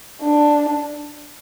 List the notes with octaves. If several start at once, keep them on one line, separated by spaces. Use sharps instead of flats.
D4